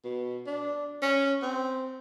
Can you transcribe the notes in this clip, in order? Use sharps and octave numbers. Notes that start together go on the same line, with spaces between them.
B2
D4
C#4
C4